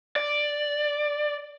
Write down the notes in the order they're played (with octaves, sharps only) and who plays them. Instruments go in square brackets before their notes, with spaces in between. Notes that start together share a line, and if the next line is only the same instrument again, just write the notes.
[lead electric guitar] D5